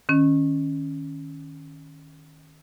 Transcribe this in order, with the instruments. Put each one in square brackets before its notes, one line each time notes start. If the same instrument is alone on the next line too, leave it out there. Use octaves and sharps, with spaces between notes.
[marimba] D#3 C#4